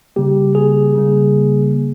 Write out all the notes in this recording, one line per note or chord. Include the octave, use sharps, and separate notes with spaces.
C#3 G3 A#3 G4
G#4
C#3 G3 A#3